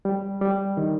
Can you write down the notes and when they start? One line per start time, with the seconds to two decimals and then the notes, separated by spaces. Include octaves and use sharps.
0.05 G3
0.41 G3
0.77 D#3